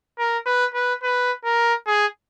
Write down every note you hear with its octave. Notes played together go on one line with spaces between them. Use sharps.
A#4
B4
B4
B4
A#4
G#4